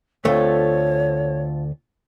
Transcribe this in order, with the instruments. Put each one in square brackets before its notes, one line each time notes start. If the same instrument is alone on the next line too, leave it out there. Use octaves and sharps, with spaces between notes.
[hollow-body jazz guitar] D2 A3 [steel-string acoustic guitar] C4 F4 A4 [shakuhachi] C#5